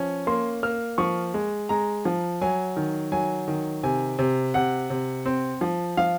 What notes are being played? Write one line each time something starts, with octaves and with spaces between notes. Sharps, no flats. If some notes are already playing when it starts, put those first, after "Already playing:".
Already playing: F3 C#4
A#3 C6
A#3 F6
F3 C#6
G#3
G#3 A#5
F3
F#3 G#5
D#3
F#3 G#5
D#3
C3 G#5
C3
C3 F#5
C3
C4
F3
F3 F5